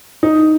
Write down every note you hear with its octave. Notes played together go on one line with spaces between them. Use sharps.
D#4